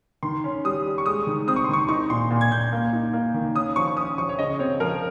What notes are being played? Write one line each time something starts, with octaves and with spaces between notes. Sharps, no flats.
D#3 C6
C#4
G3 D#6
G3
C#6
G#3 D#6
D#3
C4 D#6
C#6
C6
D#3 C#6
D#4 C#6
A#2 C6
A#2
G#6
A#2 G6
A#3
D#4
A#3
D#3
C#4 D#6
F3 C#6
C#6
C#4 D#6
F3 C#6
C#5
C#3 D#5
C4 C#5
F3 A#4